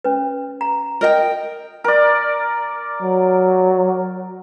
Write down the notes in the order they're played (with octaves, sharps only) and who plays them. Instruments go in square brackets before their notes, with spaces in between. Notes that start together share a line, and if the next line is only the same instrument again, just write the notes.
[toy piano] C#4 B4
A#5
[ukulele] A#4 D#5 G5
[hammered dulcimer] A#4 D5
[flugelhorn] F#3